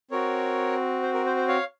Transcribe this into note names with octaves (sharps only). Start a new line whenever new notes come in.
C4 F#4 A#4 C#5
C5
A#4
C5
C5
C#5 F5